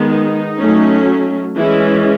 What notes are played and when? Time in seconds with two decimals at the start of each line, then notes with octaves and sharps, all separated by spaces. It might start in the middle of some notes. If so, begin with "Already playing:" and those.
Already playing: D#3 G#3 B3
0.09 D#4
0.58 F#3 A3 C#4
1.57 E3 G#3 C#4 E4